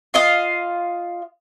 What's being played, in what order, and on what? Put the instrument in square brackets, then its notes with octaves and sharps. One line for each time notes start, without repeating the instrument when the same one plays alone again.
[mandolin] F4 D#5 F5